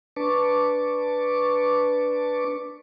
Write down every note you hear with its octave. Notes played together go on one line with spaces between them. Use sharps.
D4 B4 A5 C#6 D6